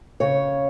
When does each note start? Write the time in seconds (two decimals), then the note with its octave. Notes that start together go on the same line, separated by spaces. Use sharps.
0.20 C#3 C#5